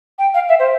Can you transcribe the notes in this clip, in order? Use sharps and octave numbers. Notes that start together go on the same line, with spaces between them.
G5
F5
E5
C5